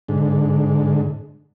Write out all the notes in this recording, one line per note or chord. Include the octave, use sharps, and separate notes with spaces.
G#2 D3